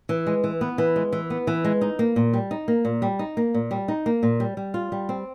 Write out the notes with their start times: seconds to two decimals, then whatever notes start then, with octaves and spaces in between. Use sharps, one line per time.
0.09 E3
0.27 G#3
0.44 E3
0.61 B3
0.78 E3
0.96 G#3
1.12 E3
1.30 B3
1.47 E3
1.65 G#3
1.81 D#4
1.99 A#3
2.16 A#2
2.33 G3
2.51 D#4
2.68 A#3
2.85 A#2
3.02 G3
3.19 D#4
3.37 A#3
3.54 A#2
3.71 G3
3.88 D#4
4.06 A#3
4.23 A#2
4.40 G3
4.57 G3
4.74 F4
4.92 G3
5.09 C4